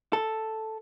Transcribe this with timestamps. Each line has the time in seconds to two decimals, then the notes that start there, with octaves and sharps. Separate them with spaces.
0.13 A4